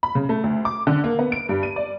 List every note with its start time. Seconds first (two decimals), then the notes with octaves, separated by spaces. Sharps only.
0.03 B5
0.15 C#3
0.29 A3
0.44 D2
0.65 D6
0.87 D3
1.04 A#3
1.19 B3
1.32 D7
1.49 G2
1.63 D#7
1.76 D5